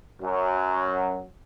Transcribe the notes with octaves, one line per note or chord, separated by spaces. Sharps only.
F#2 F#3